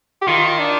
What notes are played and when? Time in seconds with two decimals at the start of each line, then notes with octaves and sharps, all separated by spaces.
0.22 G4
0.27 D#3 F4
0.37 F4
0.48 F4
0.59 D4